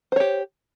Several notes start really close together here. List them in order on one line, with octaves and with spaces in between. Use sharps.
C5 C#5 G4